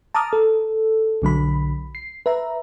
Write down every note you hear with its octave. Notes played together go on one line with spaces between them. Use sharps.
A5 A#5 D6 D#6 F6
A4
B1 D3 F#3 B5
C7
B4 E5 A#5